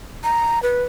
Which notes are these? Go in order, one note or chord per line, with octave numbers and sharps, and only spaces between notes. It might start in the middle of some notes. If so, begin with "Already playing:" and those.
A#5
B4